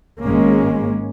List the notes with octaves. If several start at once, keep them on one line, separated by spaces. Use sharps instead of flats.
G#1 G#3 A#3 C#4